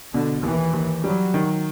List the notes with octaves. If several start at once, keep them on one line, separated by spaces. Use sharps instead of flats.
B2 D3
D#2 E3
D#2
F#3 G3
D#3